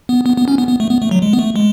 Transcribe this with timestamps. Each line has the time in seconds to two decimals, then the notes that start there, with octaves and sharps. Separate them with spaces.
0.09 B3
0.26 B3
0.37 B3
0.48 C#4
0.58 B3
0.69 B3
0.80 A3
0.90 B3
1.02 A3
1.11 F#3
1.22 G#3
1.33 B3
1.39 A3
1.56 G#3